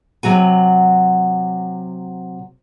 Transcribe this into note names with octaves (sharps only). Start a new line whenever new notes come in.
C3 F#3 F#4 G#5